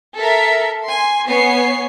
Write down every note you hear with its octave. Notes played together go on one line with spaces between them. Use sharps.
A4 A#4 E5
G#5 C6
B3 C#5 G#5 C7